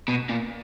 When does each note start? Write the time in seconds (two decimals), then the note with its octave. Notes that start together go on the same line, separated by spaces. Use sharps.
0.08 B2
0.29 A#2